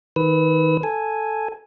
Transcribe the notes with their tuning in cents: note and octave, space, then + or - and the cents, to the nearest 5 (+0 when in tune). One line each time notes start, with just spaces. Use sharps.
D#3 +25 B4 +5 E6 -40
A4 +0 G#5 +0